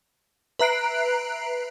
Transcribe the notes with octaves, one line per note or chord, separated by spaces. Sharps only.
B4 E5 A#5 F#6 C7 D7